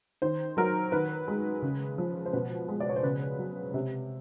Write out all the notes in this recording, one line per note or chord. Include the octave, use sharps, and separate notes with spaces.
D#3 C5
F#3 A#4
D#3 B4
G#3
C#3
F3
C5
B2 B4
G#3
D5
C#5
C5
C#3 B4
F#3
C3